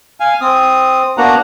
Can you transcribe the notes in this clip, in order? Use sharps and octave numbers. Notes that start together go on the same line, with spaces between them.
F5 G#5
C4 D#6
A#3 B3 D4 F#4 F#5 A#5